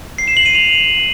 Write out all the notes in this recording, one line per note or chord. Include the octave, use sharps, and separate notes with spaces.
C7
E7
F#7
D#7
F7